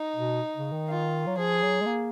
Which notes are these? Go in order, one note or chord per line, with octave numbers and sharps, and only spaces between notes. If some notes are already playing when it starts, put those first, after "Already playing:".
Already playing: D#4
B2
C#3
D#3
F4
F#3
F3 G#4
F#3
G#3
A#3